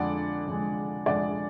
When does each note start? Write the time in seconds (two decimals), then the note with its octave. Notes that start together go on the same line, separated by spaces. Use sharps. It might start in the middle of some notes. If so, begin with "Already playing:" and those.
Already playing: F2 D3 G#3 D5 F#5
0.47 F2 D3 G#3
1.06 F2 D3 G#3 D5 F#5